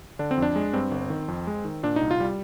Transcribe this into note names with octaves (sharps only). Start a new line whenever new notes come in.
D3 D4
C4
F2
D4
G#3
G2 C4
G1
D#3
F2
G#3
D#3
A#2 D4
C2 D#4
F4
G3